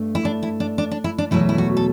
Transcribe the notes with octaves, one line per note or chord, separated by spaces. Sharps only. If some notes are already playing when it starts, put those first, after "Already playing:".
Already playing: G2 A3
E4
D4
E4
D4
D4
D4
E4
D4
E2 B2 F#3 A3 E4
E4
F#4
A4